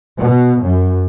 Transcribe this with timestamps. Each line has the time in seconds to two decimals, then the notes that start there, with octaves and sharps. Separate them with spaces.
0.19 B2
0.64 F#2